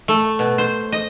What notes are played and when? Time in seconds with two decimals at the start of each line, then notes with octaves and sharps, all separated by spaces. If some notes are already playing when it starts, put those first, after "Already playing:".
0.08 A3
0.39 B2
0.58 C5
0.92 D#5